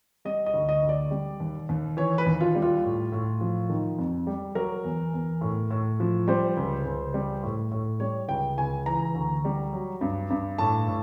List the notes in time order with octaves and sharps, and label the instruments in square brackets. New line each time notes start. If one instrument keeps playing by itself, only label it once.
[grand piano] G3 D#5
D#5
D2
D#5
D2
D5
G3
D#2
D#2
E3 C#5
B4
D#2
F4
G3
F4
A2
A2
F3
D#3
F2
G3
F#3 A#4
E2
E2
A2
A2
F3
G3 C5
C#2
C#2
G3
A2
A2
G3 C#5
C#2 G5
C#2 G#5
E3 A#5
D2
G3
F#3
G2
G2
A2 A5
A2